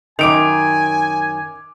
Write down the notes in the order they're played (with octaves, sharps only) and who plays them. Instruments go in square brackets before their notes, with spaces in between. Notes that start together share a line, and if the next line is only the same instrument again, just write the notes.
[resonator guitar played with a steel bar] F#2 D#3 [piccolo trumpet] G#5 [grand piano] D6 D7 F7